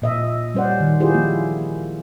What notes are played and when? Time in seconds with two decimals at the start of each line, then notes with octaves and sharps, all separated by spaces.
0.02 A#2 D#5 E5
0.54 G3 C#4 C5 D5 F#5
0.80 D#3
1.00 E4 F4 G4 G#4 C5
1.14 F3 A#3 E4